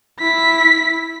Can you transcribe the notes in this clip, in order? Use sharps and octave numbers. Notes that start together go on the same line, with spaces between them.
E4 B6